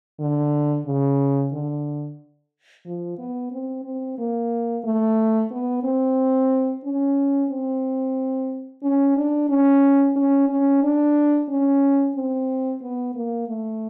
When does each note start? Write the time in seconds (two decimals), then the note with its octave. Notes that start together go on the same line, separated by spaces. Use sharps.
0.20 D3
0.86 C#3
1.52 D3
2.85 F3
3.18 B3
3.52 C4
3.84 C4
4.18 A#3
4.84 A3
5.51 B3
5.84 C4
6.84 C#4
7.50 C4
8.83 C#4
9.17 D4
9.49 C#4
10.16 C#4
10.49 C#4
10.83 D4
11.49 C#4
12.15 C4
12.82 B3
13.15 A#3
13.48 A3